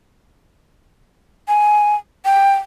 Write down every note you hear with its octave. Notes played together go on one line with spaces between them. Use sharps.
G#5
G5